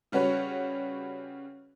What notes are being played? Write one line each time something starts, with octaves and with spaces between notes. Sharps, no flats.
C#3 G3 C#4 F#4 B4 C#5